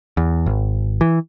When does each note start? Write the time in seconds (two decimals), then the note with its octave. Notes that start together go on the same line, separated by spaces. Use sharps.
0.17 E2
0.46 G#1
1.01 E3